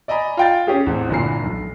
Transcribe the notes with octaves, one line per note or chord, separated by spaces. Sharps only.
D5 D#5 G#5 A#5 B5
F4 G5 A6
C#4 G4 G#4
A1 E2 C4
G1 A#2 E3 A#5 C7
B1